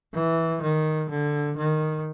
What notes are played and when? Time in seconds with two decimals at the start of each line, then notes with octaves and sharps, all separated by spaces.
0.14 E3
0.62 D#3
1.10 D3
1.57 D#3